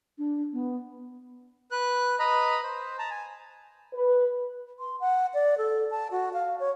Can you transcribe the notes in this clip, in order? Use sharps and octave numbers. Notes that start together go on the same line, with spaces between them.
D4
B3
B4 F#6
B4 D#5 A#5 B5
C5
A5 A#5
G#5
B4
C6
F#5
D5
A4
A5
F#4
F5
C#5